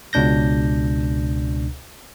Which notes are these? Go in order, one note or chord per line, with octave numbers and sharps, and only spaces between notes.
C#2 B2 D4 G6 A#6